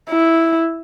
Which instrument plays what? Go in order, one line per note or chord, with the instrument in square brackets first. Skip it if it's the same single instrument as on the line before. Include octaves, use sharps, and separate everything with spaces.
[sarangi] E4